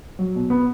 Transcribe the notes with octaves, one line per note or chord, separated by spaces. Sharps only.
F#3
B2
B3